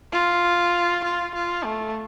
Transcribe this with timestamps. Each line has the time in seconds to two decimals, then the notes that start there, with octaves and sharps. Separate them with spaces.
0.12 F4
1.04 F4
1.35 F4
1.65 A3